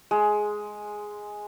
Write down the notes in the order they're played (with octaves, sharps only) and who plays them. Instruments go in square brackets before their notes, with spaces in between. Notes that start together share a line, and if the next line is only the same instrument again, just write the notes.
[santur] G#3